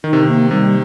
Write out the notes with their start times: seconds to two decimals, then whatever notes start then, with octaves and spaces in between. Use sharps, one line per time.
0.04 D#3 D#4
0.13 C3
0.23 D#3 A#3
0.51 C3 G3